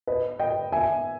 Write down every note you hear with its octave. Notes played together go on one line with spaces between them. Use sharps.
B4 D#5
D#5 G5
E5 G#5